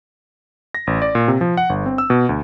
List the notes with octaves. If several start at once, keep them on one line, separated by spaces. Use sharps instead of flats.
A#6
A1
D5
A#2
C3
F3
F#5
G1
C4
E6
B2
D2